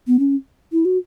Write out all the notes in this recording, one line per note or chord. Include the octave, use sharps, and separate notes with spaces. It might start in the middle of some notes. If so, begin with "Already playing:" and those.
B3
C#4
E4
F#4